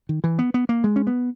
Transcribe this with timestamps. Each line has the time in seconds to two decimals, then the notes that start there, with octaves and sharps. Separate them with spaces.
0.09 D#3
0.24 E3
0.39 B3
0.54 B3
0.69 A#3
0.84 G#3
0.96 C#4
1.07 B3